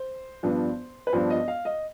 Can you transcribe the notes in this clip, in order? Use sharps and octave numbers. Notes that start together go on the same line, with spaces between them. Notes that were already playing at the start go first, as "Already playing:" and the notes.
Already playing: C5
G2 F3 B3 D4
B4
G2 F3 B3 D4 C5
D#5
F5
D#5